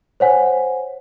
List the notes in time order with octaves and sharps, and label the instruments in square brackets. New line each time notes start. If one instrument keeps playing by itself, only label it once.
[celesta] C5 C#5 F#5 G#5